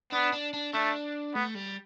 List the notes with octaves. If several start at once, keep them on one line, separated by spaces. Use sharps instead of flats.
B3 D4
D4
D4
A3 D4
A3 B3
G3